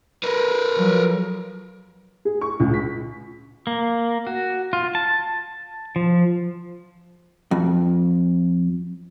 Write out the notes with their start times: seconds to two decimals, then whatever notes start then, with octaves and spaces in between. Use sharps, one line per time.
0.24 A#4 B4
0.77 F3 F#3
2.25 G#4
2.41 C#6
2.60 C#2
2.74 B6
3.67 A#3
4.27 F#4
4.73 F4
4.95 A5
5.96 F3
7.51 F2